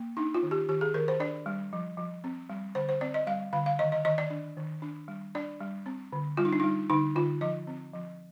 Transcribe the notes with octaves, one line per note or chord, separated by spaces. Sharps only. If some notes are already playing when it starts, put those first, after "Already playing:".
Already playing: A#3
D4 D#4
F4
D#3
G4
D#3 G4
G#4
D#3 A#4
C5
D4 D5
G3
F3
F3
C4
G3
D3 C5
C5
C4 D5
D#5
G3 F5
D3 F5
F5
D#3 D#5
D#5
D#3 D#5
D5
D4
D#3
D4
G3
D4 D5
G3
C4
D3
G3 F4
D#4
D4
G3 D#4
D3 D#4
D3 F4
F3 D#5
C4
F3